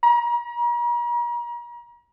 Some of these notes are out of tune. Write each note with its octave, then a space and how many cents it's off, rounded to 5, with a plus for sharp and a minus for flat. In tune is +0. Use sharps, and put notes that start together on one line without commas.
A#5 +40